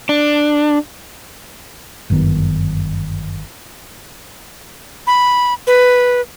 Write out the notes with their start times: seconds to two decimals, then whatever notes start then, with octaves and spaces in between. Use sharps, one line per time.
0.09 D4
2.10 G1 F#2 D#3 B3
5.07 B5
5.67 B4